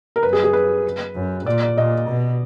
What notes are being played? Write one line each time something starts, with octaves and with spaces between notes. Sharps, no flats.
A#4
F#2 B4
G#4
G#4
B4
F#2
A#2 D5
D5
A#2 D#5
B2